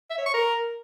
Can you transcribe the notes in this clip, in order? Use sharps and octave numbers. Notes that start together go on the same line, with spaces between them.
E5
C#5
C#6
A#4